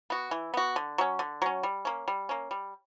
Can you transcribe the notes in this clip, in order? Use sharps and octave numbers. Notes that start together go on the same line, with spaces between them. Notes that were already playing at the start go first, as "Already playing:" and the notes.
B3 F#4
E3
B3 F#4
D3
F#3 C#4
D3
F#3 C#4
G3
A#3 C#4
G3
A#3 C#4
G3